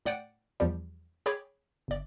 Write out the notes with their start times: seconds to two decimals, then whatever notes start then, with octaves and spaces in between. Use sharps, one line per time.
0.05 A2 D5 F#5 G5 D7
0.60 E2 F3 G3
1.26 G#4 C#5 G5 B5 D6 G#6
1.88 G1 D5